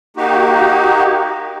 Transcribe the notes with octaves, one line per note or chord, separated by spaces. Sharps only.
A#3 D#4 F#4 G4